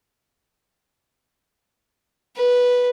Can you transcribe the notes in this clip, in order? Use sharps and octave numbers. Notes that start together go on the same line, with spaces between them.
B4